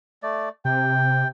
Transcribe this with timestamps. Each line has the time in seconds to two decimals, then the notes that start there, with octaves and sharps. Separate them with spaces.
0.23 A3 D5
0.65 C3 G5